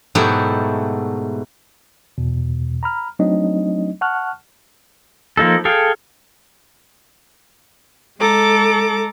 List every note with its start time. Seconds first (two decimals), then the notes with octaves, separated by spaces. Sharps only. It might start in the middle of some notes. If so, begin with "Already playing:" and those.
0.15 G#2 B2 F#3 A3 E4 G4
2.18 E2 B2
2.83 A#5 B5 F6
3.19 F#3 A3 C4 D4 D#4 D#5
4.01 F#5 A5 C#6 F6 F#6
5.37 F3 A#3 D#4 A4
5.65 G#4 A4 F5 G5
8.20 G#3 A4 A#5 D6